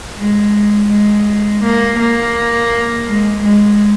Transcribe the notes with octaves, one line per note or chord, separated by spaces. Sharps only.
G#3
G#3
A#3
A#3
G#3
G#3